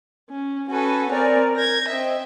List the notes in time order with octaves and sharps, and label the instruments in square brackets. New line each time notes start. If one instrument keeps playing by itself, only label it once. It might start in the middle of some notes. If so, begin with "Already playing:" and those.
[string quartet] C#4
[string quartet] C#4 F#4 A4 [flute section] B4 G#5
[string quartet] C4 C#5 G#5 [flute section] A#4 D5
[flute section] A#4 G6 [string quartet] G#6 A#6
[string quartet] C4 E5 [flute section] D#5